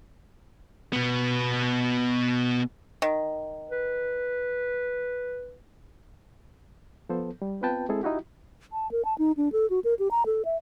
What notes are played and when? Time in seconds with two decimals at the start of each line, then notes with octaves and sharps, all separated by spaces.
0.93 B2 B3
3.02 D#3
3.70 B4
7.09 F3 B3 A4 C5
7.42 G3
7.61 B3 C4 F4 B4 G5 A5
7.89 G#3 C4 E4 G#4 A4
8.03 D#4 E4 F#4 G4
8.73 A5
8.92 A#4
9.05 A5
9.18 D#4
9.37 D4
9.52 A4
9.70 F#4
9.84 A#4
9.99 G4
10.11 A#5
10.26 A4
10.45 E5